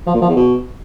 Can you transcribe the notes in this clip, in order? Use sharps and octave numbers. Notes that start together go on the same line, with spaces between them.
F3
A#2
F3
E2
B2